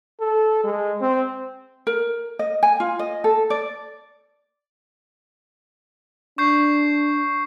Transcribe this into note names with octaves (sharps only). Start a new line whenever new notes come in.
A4
G#3
C4
A#4
D#5
G#5
F4
D#5
A4
D5
D4 C#6 G6 C7